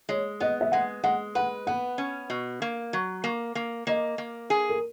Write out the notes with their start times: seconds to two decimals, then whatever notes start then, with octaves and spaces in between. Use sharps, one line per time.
0.09 G#3 C#5
0.40 B3 D#5
0.61 E5
0.72 G#3 F#5
1.04 G#3 F#5
1.35 B4 F#5
1.67 B3 F#5
1.98 C#4
2.30 B2
2.62 A#3
2.93 F#3
3.24 A#3
3.55 A#3
3.87 A#3 D#5
4.18 A#3
4.50 G#4
4.69 A#4